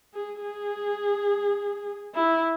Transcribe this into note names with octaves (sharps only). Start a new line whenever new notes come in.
G#4
G#4
E4